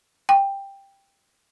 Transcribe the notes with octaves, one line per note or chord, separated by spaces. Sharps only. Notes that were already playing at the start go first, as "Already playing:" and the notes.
G5